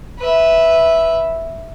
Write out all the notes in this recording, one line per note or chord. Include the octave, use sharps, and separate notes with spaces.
B4 E5